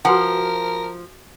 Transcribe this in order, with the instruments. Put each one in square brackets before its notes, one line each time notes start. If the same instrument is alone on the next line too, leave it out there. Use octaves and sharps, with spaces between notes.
[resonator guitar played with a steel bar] F3 [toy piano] F#4 B4 G#5 [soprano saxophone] A#4 [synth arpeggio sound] F#5